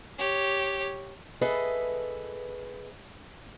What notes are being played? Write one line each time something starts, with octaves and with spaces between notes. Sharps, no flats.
G4 C#5
G#4 A4 B4 D#5 E5